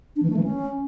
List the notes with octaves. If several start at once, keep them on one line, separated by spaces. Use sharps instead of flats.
D4
E3
A3
E3
C#4